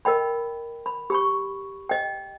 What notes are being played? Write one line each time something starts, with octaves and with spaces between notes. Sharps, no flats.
A#4 D#5 G5 B5
B5
G4 B5 C#6
D#5 G5